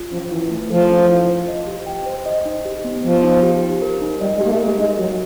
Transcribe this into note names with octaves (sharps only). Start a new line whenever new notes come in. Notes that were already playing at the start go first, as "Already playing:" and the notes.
Already playing: F4
F3 C#4
E3 E4
E3 A3
F3 A4
C#4
E4
C5
D#5
G4
G5
C5
D#5
D#4
G4
B3
F3 B3
D#4
G4
G4
A#4
D#4
G3 D#5
G#3
A#3 G4
A3
G#3 A#4
G#3 D#4
F#3 F#4